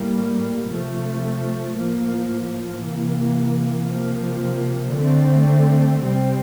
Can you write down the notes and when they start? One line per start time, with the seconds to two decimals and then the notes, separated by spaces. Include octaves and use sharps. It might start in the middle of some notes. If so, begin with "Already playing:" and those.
Already playing: A2 G3 A#3
0.69 C3 F3 A3
1.75 A2 F3 A#3
2.81 C3 E3 A#3
3.88 C3 F3 A#3
4.95 D3 A3 C4
6.02 C3 G3 C4